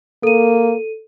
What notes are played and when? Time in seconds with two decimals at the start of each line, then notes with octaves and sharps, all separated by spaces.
0.23 A#3 A4 D#7